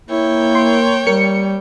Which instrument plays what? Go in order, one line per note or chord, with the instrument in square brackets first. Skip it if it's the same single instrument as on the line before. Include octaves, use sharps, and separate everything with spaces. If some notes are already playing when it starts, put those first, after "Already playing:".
[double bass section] A#3 [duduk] E4 [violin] C#5 G5
[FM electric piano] C6
[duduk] G3 [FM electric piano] A#4 C#7